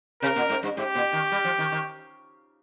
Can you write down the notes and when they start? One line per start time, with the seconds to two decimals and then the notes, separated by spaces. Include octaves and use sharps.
0.22 C3 A#4
0.36 A#2
0.50 G#2
0.63 G2
0.77 G#2 G4
0.95 A#2
1.13 D#3
1.32 G3
1.44 F3
1.58 D#3
1.72 D#3